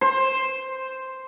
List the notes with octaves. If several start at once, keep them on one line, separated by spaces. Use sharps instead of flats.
C5